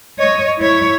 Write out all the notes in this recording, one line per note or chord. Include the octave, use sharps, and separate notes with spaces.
C#5 D#5
E4 C#5